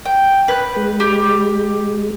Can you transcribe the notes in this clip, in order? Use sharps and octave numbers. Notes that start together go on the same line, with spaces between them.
G5
B4 F#6
G#3
G4